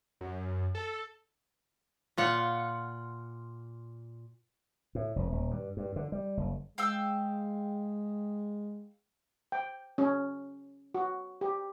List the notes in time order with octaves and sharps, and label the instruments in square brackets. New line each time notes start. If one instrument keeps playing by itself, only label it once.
[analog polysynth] F#2
A4
[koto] A#2 F4 F#5
[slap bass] A2
F1
D#1
G2
G2
D3
G3
F#1
[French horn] G#3 [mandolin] F5 G5 E6
[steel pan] G5
C#4
F#4
G4